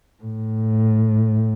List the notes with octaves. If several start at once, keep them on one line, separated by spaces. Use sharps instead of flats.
A2